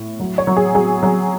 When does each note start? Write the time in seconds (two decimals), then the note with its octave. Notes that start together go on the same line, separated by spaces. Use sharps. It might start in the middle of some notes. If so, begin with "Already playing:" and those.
Already playing: A2
0.20 F#3
0.38 C#5
0.47 F#3
0.57 G#4
0.75 F#3 G#4
1.03 F#3